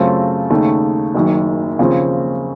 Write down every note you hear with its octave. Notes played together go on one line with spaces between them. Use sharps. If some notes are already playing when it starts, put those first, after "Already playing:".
Already playing: F#2 C#3 A3 C4 F4
D#2 C#3 A3 D#4
F#1 F#2 D#3
D#2 C#3 F3 C4